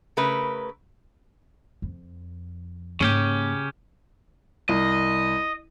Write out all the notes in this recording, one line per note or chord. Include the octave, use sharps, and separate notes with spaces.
C#3 A3 A#4 B4
F2
G#2 C#3 A#3 C#4 G4
C2 D#5